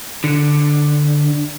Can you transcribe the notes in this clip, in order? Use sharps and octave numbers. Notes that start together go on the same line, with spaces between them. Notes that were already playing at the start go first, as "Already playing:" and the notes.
D3